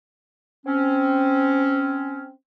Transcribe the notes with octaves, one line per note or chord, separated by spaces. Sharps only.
C4 C#4